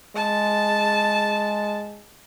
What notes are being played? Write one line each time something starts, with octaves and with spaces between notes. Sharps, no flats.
G#3 A5